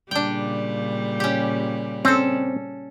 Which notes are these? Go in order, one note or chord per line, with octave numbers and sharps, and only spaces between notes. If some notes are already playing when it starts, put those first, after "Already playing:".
A#2 C#3 G3 D4 G5
C#4 G4
C4 C#4 A4